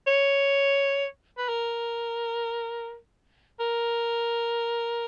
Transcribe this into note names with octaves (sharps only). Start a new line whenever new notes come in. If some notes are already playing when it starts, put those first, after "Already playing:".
C#5
B4
A#4
A#4